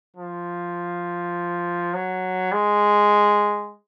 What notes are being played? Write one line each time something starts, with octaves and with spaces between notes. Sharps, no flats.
F3
F#3
G#3